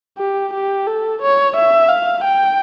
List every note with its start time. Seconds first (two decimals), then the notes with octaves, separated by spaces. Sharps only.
0.18 G4
0.53 G4
0.87 A4
1.22 C#5
1.56 E5
1.89 F5
2.25 G5